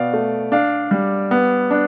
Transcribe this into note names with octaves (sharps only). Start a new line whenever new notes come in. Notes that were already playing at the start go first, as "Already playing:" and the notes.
Already playing: B2 B3 D5 F5
A3
D4 D5 F5
G3
B3
D4